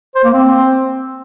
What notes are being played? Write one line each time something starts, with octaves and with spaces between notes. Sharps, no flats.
C5
A#3
C4